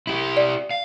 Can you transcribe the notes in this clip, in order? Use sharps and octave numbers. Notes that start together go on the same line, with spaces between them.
E4 G4
D5
F5